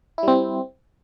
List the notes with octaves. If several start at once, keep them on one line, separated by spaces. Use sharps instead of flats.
G3 C4 E4